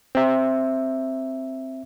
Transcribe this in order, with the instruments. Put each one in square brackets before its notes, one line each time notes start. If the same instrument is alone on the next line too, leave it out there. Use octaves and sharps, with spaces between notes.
[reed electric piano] C4 E5